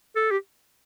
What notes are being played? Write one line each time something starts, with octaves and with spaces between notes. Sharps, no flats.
A4
G4